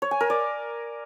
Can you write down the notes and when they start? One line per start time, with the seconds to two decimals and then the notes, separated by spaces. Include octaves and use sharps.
0.02 C#5
0.11 G#5
0.20 A#4
0.30 D5